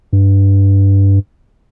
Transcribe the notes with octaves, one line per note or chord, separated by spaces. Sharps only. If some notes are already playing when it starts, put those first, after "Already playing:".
G2